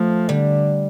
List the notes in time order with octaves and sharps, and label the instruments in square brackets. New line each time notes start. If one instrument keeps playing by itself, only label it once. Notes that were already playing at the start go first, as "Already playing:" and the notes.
Already playing: [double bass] F3 [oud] A3
[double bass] D3 [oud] G3